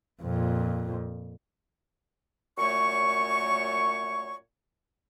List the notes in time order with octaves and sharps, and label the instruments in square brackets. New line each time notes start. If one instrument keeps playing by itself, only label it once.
[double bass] F2 A#2
[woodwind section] F#2 A#2 A3 C#5 C#6